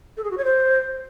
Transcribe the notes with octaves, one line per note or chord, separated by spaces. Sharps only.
A4
G#4
F#4
C#5
C5